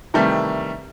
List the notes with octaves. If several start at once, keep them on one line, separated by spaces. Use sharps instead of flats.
C3 D#3 E3 G3 A3